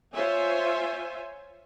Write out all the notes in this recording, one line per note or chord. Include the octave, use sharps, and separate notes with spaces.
F4 C5 C#5 E5 G#5